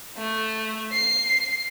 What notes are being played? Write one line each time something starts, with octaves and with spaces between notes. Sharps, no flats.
A3
C7